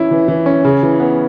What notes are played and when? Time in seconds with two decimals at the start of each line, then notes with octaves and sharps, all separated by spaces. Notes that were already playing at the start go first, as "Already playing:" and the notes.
Already playing: E3 C#4 E4
0.11 E3
0.28 E3
0.46 C#4
0.64 C#3
0.83 E3
1.00 B3